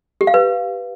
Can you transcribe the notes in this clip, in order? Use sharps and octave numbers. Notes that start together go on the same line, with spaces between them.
G4
F5
B4